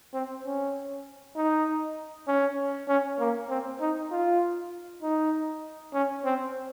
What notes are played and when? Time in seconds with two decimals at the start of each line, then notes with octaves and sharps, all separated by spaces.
0.14 C4
0.45 C#4
1.36 D#4
2.28 C#4
2.88 C#4
3.19 A#3
3.49 C4
3.81 D#4
4.11 F4
5.03 D#4
5.94 C#4
6.25 C4